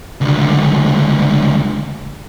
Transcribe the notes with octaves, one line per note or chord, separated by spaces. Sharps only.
C#2 D3